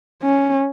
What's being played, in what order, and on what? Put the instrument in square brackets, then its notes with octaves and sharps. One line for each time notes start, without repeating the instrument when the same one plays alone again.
[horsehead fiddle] C#4